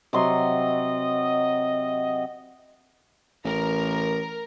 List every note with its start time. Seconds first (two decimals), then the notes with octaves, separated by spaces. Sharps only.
0.13 C3 F#3 D#5 C6
3.45 A1 A#4